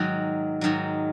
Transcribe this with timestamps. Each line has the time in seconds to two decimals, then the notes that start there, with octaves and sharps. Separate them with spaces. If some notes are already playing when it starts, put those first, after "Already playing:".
Already playing: G#2 D#3 F#3
0.61 G#2 D#3 F#3